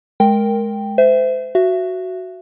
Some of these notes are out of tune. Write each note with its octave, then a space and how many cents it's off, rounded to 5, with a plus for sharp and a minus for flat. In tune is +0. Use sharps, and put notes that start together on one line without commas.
G#3 +25 A#4 +0 G5 +0
C5 -30 E5 +0
F#4 +0 E5 +25